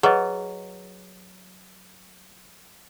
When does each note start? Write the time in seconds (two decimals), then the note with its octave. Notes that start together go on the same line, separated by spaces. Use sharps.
0.03 F#3 G#4 B4 D#5